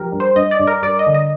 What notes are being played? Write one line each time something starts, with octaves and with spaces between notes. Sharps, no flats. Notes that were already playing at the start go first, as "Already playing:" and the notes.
Already playing: F3 G4 A#4
G2
C5
G2 D#5
D5
G2
A#4
G2 D5
D#5
D3
D#5